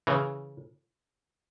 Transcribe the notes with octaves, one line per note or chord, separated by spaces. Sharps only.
C#3 E3